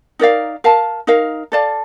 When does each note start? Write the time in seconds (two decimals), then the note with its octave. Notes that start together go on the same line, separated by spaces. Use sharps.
0.19 D#4 A#4 D5 F5
0.64 A#4 F5 A5
1.07 D#4 A#4 F5
1.52 A4 D5 F5 A5